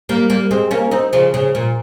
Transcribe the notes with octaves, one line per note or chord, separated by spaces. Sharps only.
G3 A#3
G3 A#3
G#3 C4
A#3 C#4
C4 D#4
C#3 F3
C#3
A#2